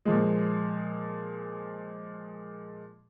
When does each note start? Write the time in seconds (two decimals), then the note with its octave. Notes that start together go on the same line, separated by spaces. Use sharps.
0.05 A#2 F3 G#3